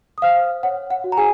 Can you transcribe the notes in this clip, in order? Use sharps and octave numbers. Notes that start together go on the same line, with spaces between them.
D#6
C5 F5 F6
C#5 F#5
F#5
F#4
A#5
G#4 G#5